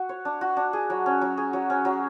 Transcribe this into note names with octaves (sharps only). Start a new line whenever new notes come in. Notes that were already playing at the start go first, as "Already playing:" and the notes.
Already playing: F#4
C#5
D4
F#4
D4
G#4
F#3
C#4
F#3
G#4
F#3
C#4
F#3